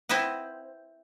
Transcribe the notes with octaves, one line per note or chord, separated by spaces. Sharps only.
C4 E4 B4 D#5 F#5